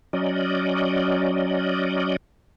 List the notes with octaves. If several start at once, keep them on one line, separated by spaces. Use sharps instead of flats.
F#3 C#4 D5 D#5